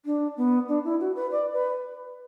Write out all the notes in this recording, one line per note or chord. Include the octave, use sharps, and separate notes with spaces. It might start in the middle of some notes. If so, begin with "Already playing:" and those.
D4
B3
D4
E4
F#4
B4
D5
B4